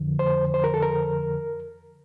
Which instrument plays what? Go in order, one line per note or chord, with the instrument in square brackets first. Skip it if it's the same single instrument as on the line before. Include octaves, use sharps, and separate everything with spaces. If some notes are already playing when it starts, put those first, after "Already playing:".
Already playing: [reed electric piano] F2 D3 F3
C5
C5
A#4
A4
A#4